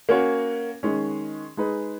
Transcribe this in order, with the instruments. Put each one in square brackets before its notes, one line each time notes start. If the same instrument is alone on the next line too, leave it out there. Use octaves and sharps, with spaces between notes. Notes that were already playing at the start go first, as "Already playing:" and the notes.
[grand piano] A#3 C#4 F#4 C#5
D#3 G#3 C#4
G#3 D#4 G#4 B4